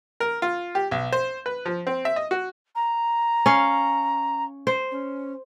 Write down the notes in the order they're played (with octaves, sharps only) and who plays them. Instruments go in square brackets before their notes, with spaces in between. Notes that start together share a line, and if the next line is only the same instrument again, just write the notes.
[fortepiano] A#4
F4
G4
B1
C5
B4
F3
C4
E5
D#5
F#4
[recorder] A#5
[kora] C#4 F5
C5
[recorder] C#4